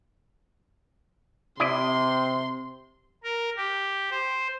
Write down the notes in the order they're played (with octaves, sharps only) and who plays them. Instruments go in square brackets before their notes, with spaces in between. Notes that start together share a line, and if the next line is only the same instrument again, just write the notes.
[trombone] C3 [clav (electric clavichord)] E4 D5 D#5 [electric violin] C6
[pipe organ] A#4
G4
C5